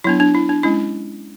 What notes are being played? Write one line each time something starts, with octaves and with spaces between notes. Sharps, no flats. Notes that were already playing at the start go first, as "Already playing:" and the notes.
F#3 B3 D4 E4
D4
E4
D4
G#3 C#4 E4